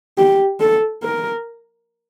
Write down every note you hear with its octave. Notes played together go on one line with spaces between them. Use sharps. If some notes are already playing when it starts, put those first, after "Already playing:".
G4
A4
A#4